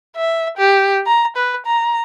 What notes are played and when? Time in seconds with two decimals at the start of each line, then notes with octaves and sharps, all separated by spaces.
0.16 E5
0.58 G4
1.06 A#5
1.37 B4
1.66 A#5